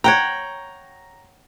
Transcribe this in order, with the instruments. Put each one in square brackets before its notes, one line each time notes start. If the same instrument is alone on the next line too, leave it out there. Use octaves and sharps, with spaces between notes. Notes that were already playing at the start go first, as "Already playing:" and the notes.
[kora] C#5 F#5 G5 [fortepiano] A#5